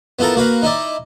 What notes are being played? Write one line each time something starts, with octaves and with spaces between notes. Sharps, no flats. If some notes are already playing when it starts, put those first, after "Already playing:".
B3 E4 F4 A4 A#4
A#3 F#4 B4 F5
D#4 E4 D5